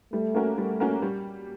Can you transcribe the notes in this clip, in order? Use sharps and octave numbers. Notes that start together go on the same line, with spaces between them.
G3 A3
A#3 C#4 F#4 A#4
G3 A3
A#3 C#4 F#4 A#4
G3